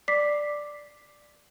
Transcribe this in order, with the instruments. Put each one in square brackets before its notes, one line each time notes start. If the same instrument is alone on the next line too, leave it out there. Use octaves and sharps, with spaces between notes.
[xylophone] D5 D6 B6 C7